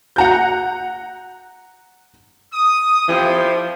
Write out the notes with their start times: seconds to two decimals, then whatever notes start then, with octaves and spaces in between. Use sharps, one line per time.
0.16 F#5 A#5 G6
2.53 D#6
3.08 F3 E4 G4